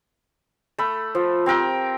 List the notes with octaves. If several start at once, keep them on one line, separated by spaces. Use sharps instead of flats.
A3 B5
F3
C4 G4 A#4 G5